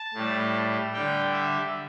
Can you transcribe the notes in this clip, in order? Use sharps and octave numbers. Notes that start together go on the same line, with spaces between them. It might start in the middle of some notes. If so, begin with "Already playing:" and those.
Already playing: A5
A2 G3
D3 G3 G5
E5